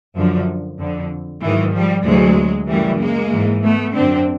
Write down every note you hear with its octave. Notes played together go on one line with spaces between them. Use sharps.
F#2 D3 F3
F2 D3
G#2 D#3 E3 F#3
F3 G3
D2 C3 E3 F#3 G#3
F#2 C#3 E3 G3 A3
G#3 A#3
G#2 E3
A3 B3
F#2 D3 C4 D4